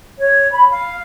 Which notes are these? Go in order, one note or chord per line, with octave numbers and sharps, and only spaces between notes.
C#5
B5
F5